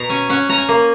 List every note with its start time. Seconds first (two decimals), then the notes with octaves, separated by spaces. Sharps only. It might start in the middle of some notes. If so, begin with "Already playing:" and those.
Already playing: B2 A#5
0.09 C#4 G#5
0.29 C#4 F#5
0.49 C#4 A#5
0.58 G#5
0.69 A#3